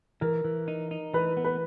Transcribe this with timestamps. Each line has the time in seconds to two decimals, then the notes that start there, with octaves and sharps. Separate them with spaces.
0.21 E3 A#4
0.44 E3
0.68 D#4
0.91 D#4
1.14 E3 B4
1.37 B3
1.44 B4